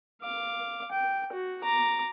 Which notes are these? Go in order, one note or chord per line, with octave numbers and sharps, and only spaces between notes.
F5 D6
G5
F#4
A#5 D6